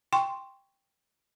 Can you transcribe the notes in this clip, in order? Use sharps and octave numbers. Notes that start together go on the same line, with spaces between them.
G5 C6 C#6